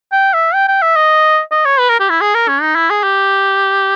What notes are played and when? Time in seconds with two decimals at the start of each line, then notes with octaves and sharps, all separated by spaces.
0.12 G5
0.34 E5
0.54 G5
0.68 G5
0.82 E5
0.96 D#5
1.52 D#5
1.65 C#5
1.79 B4
1.90 A#4
2.00 G4
2.10 E4
2.21 G#4
2.35 A#4
2.48 C#4
2.62 D#4
2.75 E4
2.90 G#4
3.03 G4